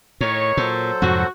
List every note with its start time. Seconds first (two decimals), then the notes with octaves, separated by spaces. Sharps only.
0.21 A2 D#3 C#5
0.57 A#2 F#3 A4 C5
1.02 F2 G#2 C3 F#4